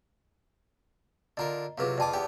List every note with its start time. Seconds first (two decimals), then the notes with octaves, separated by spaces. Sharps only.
1.37 D3 F4 A#4 D#5 A#5
1.78 C3 F#3 F4 G#4 B4 F5
1.98 F2 F4 D5 G5 A5 D6
2.13 E2 B3 G4 G5